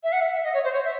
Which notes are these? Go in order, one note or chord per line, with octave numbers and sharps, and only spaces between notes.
E5
F#5
E5
E5
D#5
C#5
C5
C#5
E5